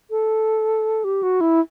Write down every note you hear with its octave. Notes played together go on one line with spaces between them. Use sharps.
A4
G4
F#4
E4